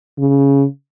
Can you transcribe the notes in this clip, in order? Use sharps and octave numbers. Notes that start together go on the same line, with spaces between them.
C#3